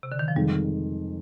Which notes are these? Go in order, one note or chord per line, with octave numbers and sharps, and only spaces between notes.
C3
D3
D#3
F3
F2 D#3 G3 G#3